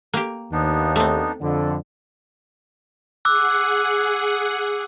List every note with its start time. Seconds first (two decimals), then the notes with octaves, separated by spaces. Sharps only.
0.14 A#3 G4
0.52 D#2 B3 D4 D#4
0.96 A3 C4
1.41 F2 D3
3.25 G#4 F#5 D6 E6 F#6